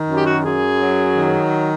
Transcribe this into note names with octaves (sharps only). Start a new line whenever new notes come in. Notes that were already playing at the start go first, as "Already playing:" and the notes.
Already playing: D#3
F#2
G4
F#4
F#2 G#4
F#3
D#3